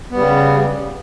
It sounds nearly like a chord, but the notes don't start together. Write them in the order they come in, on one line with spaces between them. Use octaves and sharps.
B3 G3 C#3